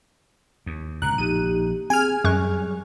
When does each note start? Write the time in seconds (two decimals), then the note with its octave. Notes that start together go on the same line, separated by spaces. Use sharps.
0.66 D#2
1.02 D1 C#2 C3 A#5 F#6
1.18 A#1 D#4 G4 D#7
1.90 C4 G#4 G#5 F6
2.24 F#2 F#3 G3 C#6 F#6